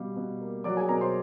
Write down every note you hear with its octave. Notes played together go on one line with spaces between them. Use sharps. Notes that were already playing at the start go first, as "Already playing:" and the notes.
Already playing: B2 G3 F5
B2
A#3
F#3 D5 D6
G#4 G#5
B2 A#4 A#5
C5 C6